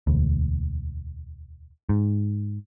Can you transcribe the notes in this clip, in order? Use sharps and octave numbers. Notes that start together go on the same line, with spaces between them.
E1 D2
G#2